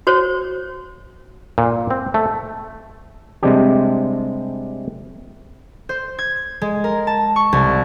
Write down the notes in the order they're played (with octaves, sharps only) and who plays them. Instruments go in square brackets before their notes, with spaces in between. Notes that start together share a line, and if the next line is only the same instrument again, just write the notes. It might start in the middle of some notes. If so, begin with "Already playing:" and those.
[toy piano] F#4 C5 C#5
[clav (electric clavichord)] A#2
C4
A3
C3 G3 G#3 C4 D4 G4
[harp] C5
G#6
G#3
A#4
A5
C#6
C2